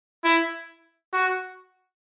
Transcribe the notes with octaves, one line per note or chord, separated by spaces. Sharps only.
E4
F#4